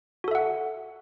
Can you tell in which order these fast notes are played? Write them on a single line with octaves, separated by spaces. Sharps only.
F#4 A4 E5 F#5